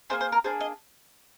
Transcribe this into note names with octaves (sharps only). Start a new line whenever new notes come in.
A#3 D4 G#4 C5
C5
A#4
A#3 D4 G#4 C5
D#5